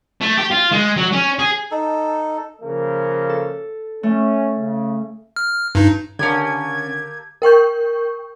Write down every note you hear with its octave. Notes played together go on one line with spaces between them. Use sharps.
A3
G4
F4
G#3
F#3
C#4
G#4
D#4 A4
C#3 F3 A#3
A4
A3 C#4
C#3
F6
G2 D#4
D3 A#3 C#4 G4 A4 D#5 G#5 G#6
A#4 G5 C#6 G6